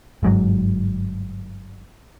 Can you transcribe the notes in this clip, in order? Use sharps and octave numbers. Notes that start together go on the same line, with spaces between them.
G1 G#2 F#3